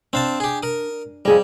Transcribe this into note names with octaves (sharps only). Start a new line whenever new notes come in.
C4 D4 F5 A5
G4 G#4
A#4 D#6
F2 G3 G#4 D#5